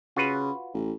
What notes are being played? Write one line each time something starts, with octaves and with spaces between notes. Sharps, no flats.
C#3 F4 F#4 B4
A1